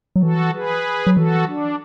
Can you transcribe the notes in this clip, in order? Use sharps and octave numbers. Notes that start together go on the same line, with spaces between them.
F#3
E3 F#4 A4
G#4 B4
F#3
E3 F#4 A4
D4